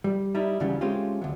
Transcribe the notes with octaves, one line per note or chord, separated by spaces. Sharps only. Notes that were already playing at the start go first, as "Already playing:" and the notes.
G3
G3 D#4 E4
D#2 C#3 E3 F#3 G3
G#3 A3 C4 C#4 F4 G4
D2 F#3